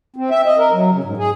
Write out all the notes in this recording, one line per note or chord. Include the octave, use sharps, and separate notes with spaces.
C4
E5
D#5
A#4
F#3
C#3
G#2
G#4